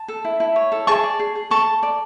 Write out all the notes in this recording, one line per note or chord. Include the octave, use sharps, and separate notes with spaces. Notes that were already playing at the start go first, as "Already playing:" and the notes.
Already playing: A5
A4
E4
E4
C#5
A4
G#4 A5 C#6
D5
G#4
G#4
A4 A5 C#6
A4
D5